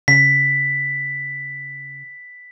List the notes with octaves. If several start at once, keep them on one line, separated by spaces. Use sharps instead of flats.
C#3 B6